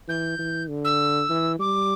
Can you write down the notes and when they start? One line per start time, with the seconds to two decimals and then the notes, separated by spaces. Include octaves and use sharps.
0.08 E3 G6
0.39 E3
0.69 D3
0.84 E6
1.30 E3
1.59 G3 D6